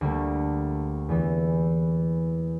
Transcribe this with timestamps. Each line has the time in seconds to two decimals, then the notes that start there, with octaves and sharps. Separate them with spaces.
0.01 D2 G3 A3 A#3
1.09 E2 E3 B3